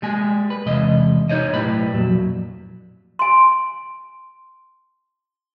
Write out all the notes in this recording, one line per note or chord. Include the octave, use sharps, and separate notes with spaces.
G3 G#3 G#5
B4
E2 C3 G#3 D#5
D#4 C5 C#5 D#5
B1 A2 G3 B4 B5
F2 A#2 F#3
G#5 C6